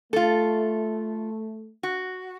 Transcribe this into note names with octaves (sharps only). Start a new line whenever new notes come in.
A3 F4 A4
F#4